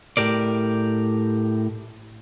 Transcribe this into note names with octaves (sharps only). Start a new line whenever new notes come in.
A2 G4 A#4 D5